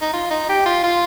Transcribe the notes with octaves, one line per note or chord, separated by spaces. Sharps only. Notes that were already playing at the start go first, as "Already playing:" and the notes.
D#4
F4
D#4
G4
F4
F4